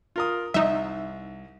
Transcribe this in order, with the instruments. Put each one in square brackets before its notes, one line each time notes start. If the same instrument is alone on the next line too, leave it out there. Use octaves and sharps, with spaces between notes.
[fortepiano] F4 A#4 D#6
[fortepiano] C2 [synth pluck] D#4 E5